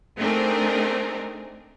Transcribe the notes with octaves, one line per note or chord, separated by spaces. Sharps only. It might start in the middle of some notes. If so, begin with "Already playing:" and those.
A3 C4 D4 D#4 G#4 A#4